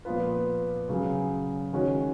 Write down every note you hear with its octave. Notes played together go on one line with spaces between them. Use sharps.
A#2 F3 B3 F4 B4
C#3 F#3 C#4 G#4
D#3 G#3 C#4 F#4 C#5